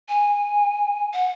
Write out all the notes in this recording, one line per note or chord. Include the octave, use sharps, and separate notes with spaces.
G#5
F#5